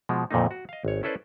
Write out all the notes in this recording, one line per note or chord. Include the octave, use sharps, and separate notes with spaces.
B2 F3 G#3
F2 A#2 D3 A3 A#3 D#4
F#4
D#5 F5
G#1 C#5
C#4 E4 A4 B4 C5 D5